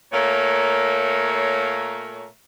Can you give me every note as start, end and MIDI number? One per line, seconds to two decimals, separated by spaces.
0.12 2.26 46
0.12 2.26 57
0.12 2.26 58
0.12 2.26 73